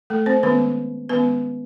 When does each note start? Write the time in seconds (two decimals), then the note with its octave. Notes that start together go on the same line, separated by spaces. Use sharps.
0.10 A3 A4
0.26 C4 C5
0.43 D#3 G#3 B3 C#4 B4
1.09 D#3 G#3 B3 C#4 B4